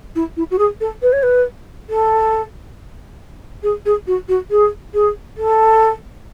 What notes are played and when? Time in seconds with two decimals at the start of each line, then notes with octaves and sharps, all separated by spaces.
0.15 E4
0.36 E4
0.51 F#4
0.58 G#4
0.80 A4
1.02 B4
1.12 C#5
1.23 B4
1.89 A4
3.63 G#4
3.85 G#4
4.07 F#4
4.28 F#4
4.50 G#4
4.94 G#4
5.37 A4